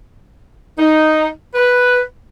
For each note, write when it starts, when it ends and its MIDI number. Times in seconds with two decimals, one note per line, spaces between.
0.79 1.29 63
1.55 2.02 71